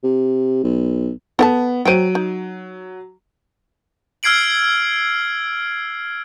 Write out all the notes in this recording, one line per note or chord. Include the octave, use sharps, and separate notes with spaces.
C3
B1
B3 A4 G5 A5
F#3 C5 G5 D7 D#7
D#4
E6 F6 G#6 C7 D7 F#7